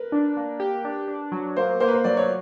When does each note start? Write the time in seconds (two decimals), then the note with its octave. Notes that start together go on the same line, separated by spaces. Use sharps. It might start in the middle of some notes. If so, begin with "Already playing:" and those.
Already playing: A#4 B4
0.12 D4
0.37 A#3
0.60 G4
0.85 D4
1.08 D4
1.32 F#3
1.56 A#3 C5
1.80 A#3 C5
1.88 B4
1.94 C5
2.04 F#3 D5
2.17 C#5